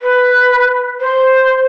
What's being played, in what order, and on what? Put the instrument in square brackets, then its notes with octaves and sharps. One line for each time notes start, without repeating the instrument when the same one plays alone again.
[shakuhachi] B4
C5